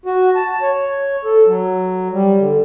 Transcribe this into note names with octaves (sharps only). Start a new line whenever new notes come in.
F#4
A5
C#5
A4
F#3
G3
D3